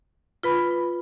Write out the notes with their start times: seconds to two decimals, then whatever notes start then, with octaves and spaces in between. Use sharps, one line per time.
0.43 F4 B4 B5